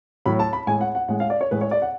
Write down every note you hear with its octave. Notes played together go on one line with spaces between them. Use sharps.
A2 F#3 B5
A5
B5
A2 G#3 G#5
F#5
F#5
A2 G#3 F#5
F5
D5
C#5
A2 G#3 B4
C#5
D5
F#5